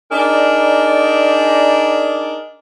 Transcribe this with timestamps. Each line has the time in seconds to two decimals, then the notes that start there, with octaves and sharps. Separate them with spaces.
0.12 D4 D#4 G#4 A#4 D5